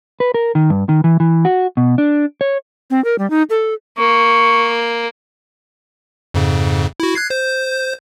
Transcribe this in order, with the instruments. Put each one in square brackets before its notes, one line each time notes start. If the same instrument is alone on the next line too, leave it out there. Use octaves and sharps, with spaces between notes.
[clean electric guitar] B4
A#4
D#3
G2
D#3
E3
E3
F#4
B2
D4
C#5
[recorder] C4
A#4
G3
D#4
A4
[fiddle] A#3 [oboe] C#6
[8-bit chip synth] F2 G#2 C#3
E4 F#4
F#6 G#6 C7
C5 G6